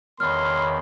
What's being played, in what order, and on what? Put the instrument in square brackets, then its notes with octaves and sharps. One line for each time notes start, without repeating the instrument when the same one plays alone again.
[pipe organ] E2 D#3 [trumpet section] C#5 B5 [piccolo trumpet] C6 [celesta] F6